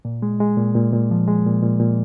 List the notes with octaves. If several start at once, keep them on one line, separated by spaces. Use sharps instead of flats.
A#2
G#3
G#3
A#2
A#2
A#2
F3
G#3
A#2
A#2
A#2